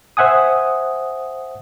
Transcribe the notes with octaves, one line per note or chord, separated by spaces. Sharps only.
C5 E5 F#5 G#5 D#6